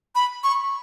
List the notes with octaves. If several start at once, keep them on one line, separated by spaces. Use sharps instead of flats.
B5
C#6